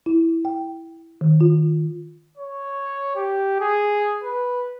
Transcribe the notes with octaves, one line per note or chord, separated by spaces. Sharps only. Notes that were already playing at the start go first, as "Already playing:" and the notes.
E4
G5
D#3
F4
C#5
G4
G#4
B4